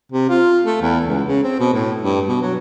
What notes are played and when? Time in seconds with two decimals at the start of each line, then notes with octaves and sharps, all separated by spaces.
0.12 C3
0.29 F4
0.65 A3
0.81 E2
1.07 C#2
1.27 C#3
1.43 C4
1.59 B2
1.74 A2
2.01 G2
2.28 B2
2.42 F#3